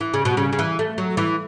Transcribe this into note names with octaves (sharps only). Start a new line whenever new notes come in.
E3
C#3
B2
C#3
C#3
E3
A3
F#3
E3